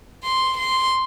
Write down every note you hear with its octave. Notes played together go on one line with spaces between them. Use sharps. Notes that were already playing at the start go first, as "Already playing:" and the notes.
C6
C6